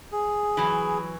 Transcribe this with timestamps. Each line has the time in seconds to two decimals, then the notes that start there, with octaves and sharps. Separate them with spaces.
0.12 G#4
0.57 E3 F#3